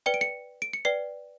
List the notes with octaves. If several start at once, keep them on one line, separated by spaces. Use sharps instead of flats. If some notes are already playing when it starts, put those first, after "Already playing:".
B4 D5 G5 C#7
D7
C#7
D7
C#7
B4 D5 G5 C7